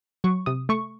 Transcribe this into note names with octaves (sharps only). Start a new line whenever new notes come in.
F#3 C#6
C3 D#6
A3 C#6